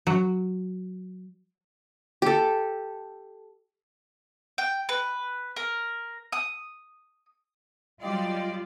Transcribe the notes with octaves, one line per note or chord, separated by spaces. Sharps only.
F#3
G4 A4
G5
B4
A#4
D#6
F#3 G3 F4 D5 D#5 G5